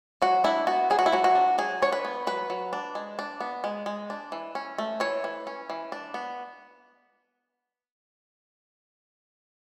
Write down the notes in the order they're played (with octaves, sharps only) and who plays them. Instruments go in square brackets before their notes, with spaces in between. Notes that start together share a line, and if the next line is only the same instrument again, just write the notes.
[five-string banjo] F#3 F#4
D4 E4
B3 F#4
F#3 G#4
F#4
E4
F#3 F#4
F#4
D4
F#3 G#4
D4 C#5
B4
B3
F#3 B4
F#3
D4
G#3
D4
B3
G#3
G#3
D4
E3
C#4
A3
E3 C#5
E3
C#4
E3
D4
B3